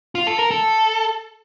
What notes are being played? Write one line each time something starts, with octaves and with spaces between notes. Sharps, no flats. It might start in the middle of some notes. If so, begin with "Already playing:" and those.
F4
A4
A#4
A4